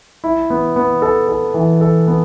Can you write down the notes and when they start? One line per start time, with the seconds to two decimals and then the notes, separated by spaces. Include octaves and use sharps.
0.24 E4
0.50 B3
0.76 B3
1.02 A4
1.28 A4
1.54 E3
1.81 A4
2.07 B3